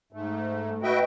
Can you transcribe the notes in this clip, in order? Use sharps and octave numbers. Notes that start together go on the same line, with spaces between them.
G#2 A3
F#4 B4 D#5 E5 G5